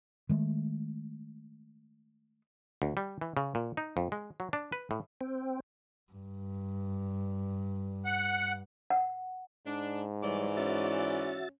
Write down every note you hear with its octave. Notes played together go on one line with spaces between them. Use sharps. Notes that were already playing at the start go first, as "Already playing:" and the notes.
D#3 G#3 A3
D2
G3
E3
C#3
A#2
D#4
F2
G#3
F#3
D4
B4
A2
C4
G2
F#5
F#5
G#2 D4
E3 G3 C#5 D5
C#4 F#4 E5 A6